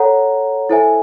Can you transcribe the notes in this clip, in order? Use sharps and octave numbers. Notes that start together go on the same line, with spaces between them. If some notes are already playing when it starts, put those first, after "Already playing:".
Already playing: A4 C#5 F#5 A#5
E4 A4 C5 E5 G#5